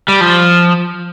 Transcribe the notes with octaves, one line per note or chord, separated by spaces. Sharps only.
G3
F3